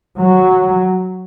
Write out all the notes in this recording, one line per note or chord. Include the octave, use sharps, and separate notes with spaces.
F#3